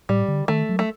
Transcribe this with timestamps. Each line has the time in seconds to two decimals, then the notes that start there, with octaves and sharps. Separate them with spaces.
0.09 A2 G3
0.28 D3
0.48 D#3 A3
0.69 F#3
0.79 A3